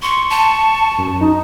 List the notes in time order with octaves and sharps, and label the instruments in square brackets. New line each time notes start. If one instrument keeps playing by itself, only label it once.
[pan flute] C6 [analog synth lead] C#6
[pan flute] A5
[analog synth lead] F#2
D#4